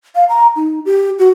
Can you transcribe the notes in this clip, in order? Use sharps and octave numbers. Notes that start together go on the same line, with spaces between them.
F5
A#5
D#4
G4
F#4